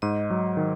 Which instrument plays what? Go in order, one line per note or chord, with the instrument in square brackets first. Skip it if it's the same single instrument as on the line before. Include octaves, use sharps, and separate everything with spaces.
[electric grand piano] G#2 [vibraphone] D#5
[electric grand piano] F#3
D#3